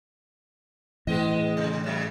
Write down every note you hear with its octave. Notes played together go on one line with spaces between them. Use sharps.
A2 E3 G#3 B3 D#5
C3
C#3 F#3